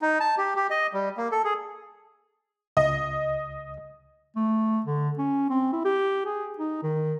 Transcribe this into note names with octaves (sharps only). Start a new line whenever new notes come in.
D#4
A5
G4
G4
D#5
G3
A#3
A4
G#4
C#2 D#5
A3
D3
C#4
C4
E4
G4
G#4
D#4
D#3